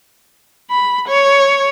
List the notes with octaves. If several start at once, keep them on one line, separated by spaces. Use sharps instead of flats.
B5
C#5